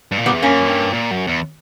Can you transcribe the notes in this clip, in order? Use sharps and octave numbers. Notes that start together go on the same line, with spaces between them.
G2
A#2
G3 B3
E2
F#2 A#3 C#4
G2
A#2
F#2
E2